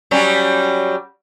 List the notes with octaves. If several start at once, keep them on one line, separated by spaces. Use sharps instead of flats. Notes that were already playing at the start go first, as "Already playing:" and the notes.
F#3 G3 C#4